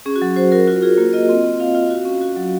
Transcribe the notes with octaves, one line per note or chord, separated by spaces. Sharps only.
C#4 G#4
F#4
F#3
F#4 C5
F#4 A#4
F4 F#4
A#4
F4 G#4
A#3 F#4
F4 D#5
C4
C4
F4 F5
F4
F#4
C#4
F#4
F#3